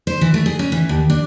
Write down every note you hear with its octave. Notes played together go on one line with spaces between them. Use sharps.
C5
E3
A3
G#4
C#4
E3
D#2
D4